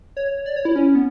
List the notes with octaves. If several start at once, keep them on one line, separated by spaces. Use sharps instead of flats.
C#5
D5
C#5
E4
C#4
B3